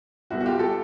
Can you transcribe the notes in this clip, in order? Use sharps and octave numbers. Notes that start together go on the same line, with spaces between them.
C2 B2 G3 B3 E4 F#4
F#4
F4 G4
G4 A4